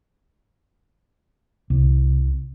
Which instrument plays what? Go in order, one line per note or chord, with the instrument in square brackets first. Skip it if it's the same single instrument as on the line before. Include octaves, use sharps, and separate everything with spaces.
[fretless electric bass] C2